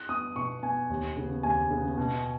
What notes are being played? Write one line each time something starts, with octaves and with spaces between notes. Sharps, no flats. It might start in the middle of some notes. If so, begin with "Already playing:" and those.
Already playing: F#6
B3 D#6
B2 C#6
B3 G#5
D#2
C#3 B3
D#2 G#5
C#3 B3
B2